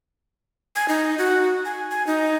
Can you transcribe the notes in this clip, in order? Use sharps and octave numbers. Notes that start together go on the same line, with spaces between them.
G#5
D#4
F#4
G#5
G#5
D#4